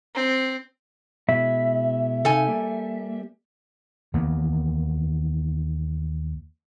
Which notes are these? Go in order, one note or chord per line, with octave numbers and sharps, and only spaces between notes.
C4
B2 G#3 E4 E5
C3 D#4 A4 F5 G#5
G3 A#3
D#2 E3 A#3 B3